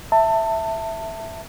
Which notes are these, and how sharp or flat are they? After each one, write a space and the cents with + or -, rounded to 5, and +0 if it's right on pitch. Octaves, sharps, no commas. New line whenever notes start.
E5 +0 A5 +25